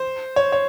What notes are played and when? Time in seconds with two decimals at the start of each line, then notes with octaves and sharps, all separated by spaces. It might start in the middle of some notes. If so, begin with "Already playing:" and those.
Already playing: C5
0.36 C#5
0.52 C#5